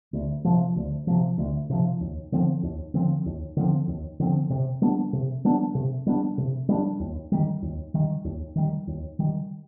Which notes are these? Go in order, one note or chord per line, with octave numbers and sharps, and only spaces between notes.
D2
C3 F3
D2
C3 F3
D2
C3 F3
D#2
D3 F3 C4
D#2
D3 F3 C4
D#2
D3 F3 C4
D#2
D3 F3 C4
C3
G3 B3 D4
C3
G3 B3 D4
C3
G3 B3 D4
C3
G3 B3 D4
D#2
D#3 G3
D#2
D#3 G3
D#2
D#3 G3
D#2
D#3 G3